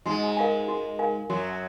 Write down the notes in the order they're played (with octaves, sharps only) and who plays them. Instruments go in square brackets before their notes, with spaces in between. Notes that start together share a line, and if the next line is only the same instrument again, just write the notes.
[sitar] G#2 G#3 [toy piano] F#4
[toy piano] A#4 F5 G#5
F#4
A#4 F5 G#5
[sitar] F#2 F#3 [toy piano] F#4